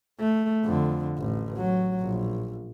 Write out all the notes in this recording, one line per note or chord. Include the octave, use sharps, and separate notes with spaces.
A3
F2 D3
A1
F#3
A#1